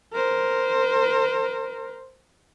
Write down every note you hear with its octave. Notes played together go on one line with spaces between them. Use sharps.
A#4 C5